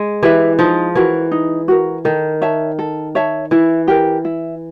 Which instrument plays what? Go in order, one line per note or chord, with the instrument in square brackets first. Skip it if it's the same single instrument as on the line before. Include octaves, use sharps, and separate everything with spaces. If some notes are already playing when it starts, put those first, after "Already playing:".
Already playing: [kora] G#3
[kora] E3 [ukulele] G4 B4 E5
[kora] F3 [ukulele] D#4
[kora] E3 [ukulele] F#4 A#4
[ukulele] D#4
F#4 A#4
[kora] D#3 [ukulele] A4
[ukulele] C#5 E5 A5
A4
C#5 E5 A5
[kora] E3 [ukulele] E4
[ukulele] G4 A#4
E4